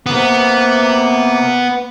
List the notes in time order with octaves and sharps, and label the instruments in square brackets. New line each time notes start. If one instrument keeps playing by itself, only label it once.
[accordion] C3 A#3 [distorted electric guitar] B3